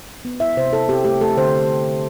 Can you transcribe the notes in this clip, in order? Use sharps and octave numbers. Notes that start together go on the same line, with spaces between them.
B3
E4 E5
C3 C5
E4 A4
C4 G4
A3 G4
A3 A4
D3 C5